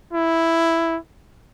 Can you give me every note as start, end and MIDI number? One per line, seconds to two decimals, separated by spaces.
0.13 0.97 64